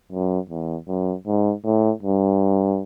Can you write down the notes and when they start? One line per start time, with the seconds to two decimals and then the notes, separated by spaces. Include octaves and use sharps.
0.12 F#2
0.50 E2
0.88 F#2
1.27 G#2
1.64 A2
2.03 G2